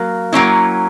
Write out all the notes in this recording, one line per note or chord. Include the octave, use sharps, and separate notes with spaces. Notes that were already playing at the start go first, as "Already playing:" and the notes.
Already playing: F#3 A#3
F#3 A#3 C#4 E4